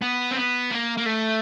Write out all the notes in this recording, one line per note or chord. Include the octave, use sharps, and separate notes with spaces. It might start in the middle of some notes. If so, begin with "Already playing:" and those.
B3
C4
B3
A#3
A#3
A3